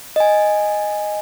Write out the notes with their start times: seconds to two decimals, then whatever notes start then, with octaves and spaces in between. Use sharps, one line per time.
0.16 D#5 G#5